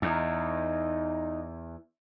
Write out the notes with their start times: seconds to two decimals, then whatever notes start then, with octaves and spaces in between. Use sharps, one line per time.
0.02 E2 D#4